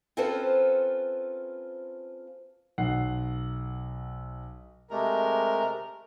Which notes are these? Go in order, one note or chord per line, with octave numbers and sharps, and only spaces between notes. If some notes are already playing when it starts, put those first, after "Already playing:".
C4 C#4 F4 A4 B4 C5
B1 F#5 C7
C3 G#3 A3 A#4